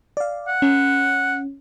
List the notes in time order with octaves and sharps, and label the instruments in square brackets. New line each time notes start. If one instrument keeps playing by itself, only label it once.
[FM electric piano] D5 F5
[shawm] F#5
[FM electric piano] C#4